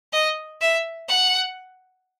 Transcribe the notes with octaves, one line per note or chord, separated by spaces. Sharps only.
D#5
E5
F#5